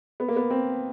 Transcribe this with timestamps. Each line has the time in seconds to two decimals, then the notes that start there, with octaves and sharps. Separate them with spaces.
0.20 B3
0.28 A#3
0.36 B3
0.51 C4